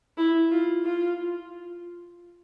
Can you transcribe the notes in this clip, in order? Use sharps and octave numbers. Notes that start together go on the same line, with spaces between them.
E4
F4
F4